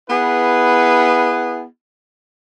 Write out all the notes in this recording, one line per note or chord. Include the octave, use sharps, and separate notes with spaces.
B3 E4 G#4 B4